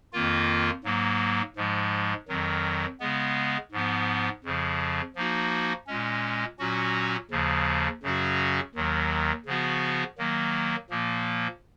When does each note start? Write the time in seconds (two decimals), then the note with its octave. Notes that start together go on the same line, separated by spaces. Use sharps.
0.13 F2 D#3 A#3 F4
0.84 G#2 F#3 A#3
1.56 G#2 F3 G#3
2.28 F2 D#3 F#3
3.00 C#3 G#3 B3
3.72 G#2 F3 B3
4.44 F2 C#3 F3
5.16 F3 A#3 D#4 F#4
5.87 A#2 G#3 C#4
6.59 A#2 F#3 C#4 F#4
7.31 D#2 C#3 F3
8.03 F#2 C#3 F#3 C#4 F#4
8.75 D#2 D#3 F#3
9.46 C#3 F3 B3 F#4
10.18 D#3 F#3 A#3
10.90 A#2 F3 A#3